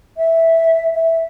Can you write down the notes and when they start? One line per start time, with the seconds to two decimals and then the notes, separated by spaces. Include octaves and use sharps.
0.17 E5
0.95 E5